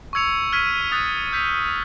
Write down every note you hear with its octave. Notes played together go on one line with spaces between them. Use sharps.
C#6 E6 G#6 C#7 F7
C#6 F6 G#6 B6 D#7
D#6 F#6 A6
E6 G6 B6